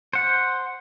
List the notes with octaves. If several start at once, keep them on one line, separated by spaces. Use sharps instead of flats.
C5 F#5